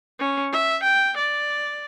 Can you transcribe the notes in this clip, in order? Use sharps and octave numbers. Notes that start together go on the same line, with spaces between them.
C#4
E5
G5
D5